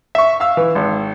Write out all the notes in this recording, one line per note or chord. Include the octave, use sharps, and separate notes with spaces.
E5 C#6
F5 E6
E3
G#1